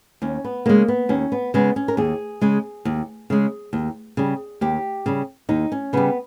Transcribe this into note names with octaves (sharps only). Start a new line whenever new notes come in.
D#2 C#4
B3
C#3 G#3 A#3
B3
D#2 C#4
B3
C#3 G#3 B3
C#4
A#4
D#2 G#4
C#3 G#3
D#2
C#3 G#3
D#2
C#3 G3
D#2 G4
C#3 G3
D#2 D#4
C#4
C#3 G3 B3